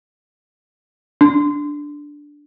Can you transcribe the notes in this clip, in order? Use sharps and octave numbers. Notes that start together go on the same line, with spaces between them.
D4